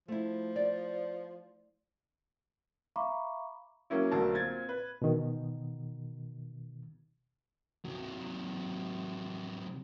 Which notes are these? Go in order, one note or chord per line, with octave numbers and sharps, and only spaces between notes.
F3 A3 E4
D5
E5 F5 A#5 B5 C#6 D6
F#3 A#3 C#4 E4
B1 D3 F#3 A3 A#4 A5
A#2 C4 G#6 A6
B4
B2 D#3
C3 F#3